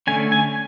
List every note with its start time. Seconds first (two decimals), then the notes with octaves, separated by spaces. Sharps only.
0.07 D3 A3 C#4 G#5
0.32 G#5